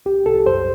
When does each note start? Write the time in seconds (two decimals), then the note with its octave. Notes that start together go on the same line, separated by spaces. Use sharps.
0.06 C2 G4
0.26 C2 A4
0.46 F#2 C5